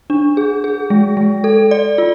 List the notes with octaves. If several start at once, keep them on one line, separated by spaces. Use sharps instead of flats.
D4
G#4
G#4
G#3
G#3
A4
D5
F4